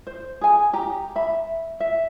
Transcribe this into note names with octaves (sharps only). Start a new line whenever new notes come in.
C5
G#4 G#5
G4 A#5
E5 B5
E5